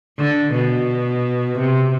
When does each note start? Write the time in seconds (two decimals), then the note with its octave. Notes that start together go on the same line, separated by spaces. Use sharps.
0.19 D3
0.53 B2
1.58 C3